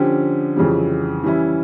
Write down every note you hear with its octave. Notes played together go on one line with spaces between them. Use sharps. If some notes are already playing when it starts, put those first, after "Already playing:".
Already playing: D3 F3 C#4 G4
F2 C#3 E3 G3
E3 G3 C#4 E4